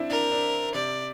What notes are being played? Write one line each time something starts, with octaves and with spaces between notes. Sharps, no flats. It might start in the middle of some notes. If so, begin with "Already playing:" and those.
Already playing: C4 D4 E4
D4 A#4
D4
C3 D5